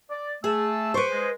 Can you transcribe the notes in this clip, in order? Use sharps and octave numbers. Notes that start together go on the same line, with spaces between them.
D5
A3 G#4 A5 E6
B4 C5 C#6 D6
G#3